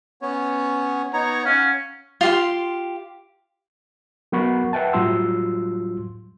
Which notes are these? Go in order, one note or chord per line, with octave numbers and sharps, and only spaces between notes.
B3 C#4 C#5
B3 D#4 C#5 A#5
C#4 F5 F#5
F4 G4 C6
F#3 B3 A#4 F#5 B5 C#6
B4 E5 F#5 G5 A5
A2 F#3 G3 F4 C6 E6